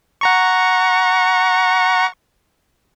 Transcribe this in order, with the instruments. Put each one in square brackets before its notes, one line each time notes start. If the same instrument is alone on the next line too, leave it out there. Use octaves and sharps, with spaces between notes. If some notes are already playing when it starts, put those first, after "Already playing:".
[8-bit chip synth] F#5 A#5 C#6